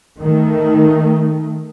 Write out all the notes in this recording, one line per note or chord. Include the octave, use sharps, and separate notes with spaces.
D#3 A3